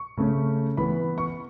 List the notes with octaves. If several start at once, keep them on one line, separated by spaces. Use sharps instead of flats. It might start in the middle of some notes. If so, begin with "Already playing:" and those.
Already playing: C#6
C#3 A3 C#4
E3 B3 B5
C#6